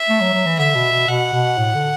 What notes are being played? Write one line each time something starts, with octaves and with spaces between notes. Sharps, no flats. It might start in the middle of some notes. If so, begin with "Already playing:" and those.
Already playing: E5
A3
F#3
F#3
E3
D3 E5
B2
B2
B2 F#5
B2
A2
D3